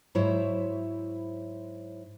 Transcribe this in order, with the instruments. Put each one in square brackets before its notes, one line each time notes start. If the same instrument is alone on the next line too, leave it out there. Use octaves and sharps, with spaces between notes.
[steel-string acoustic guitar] G#2 F#3 E4 C5 C#5 E5